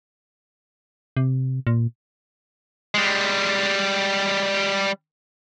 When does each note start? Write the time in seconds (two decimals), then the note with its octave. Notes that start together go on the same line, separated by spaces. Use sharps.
1.17 C3
1.67 A#2
2.94 G3 G#3